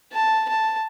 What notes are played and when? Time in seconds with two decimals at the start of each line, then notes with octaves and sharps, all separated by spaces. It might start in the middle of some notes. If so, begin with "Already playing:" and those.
0.12 A5
0.48 A5